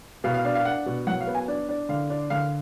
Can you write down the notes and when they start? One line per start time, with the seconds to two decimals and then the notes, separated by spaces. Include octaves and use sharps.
0.24 B2 F5
0.34 F5
0.45 D4 F5
0.55 F5
0.65 D4 F#5
0.86 B2
1.07 F#3 F#5
1.21 F5
1.27 B3
1.35 G#5
1.48 D4
1.69 D4
1.89 D3 F5
2.10 D4
2.30 D3 F5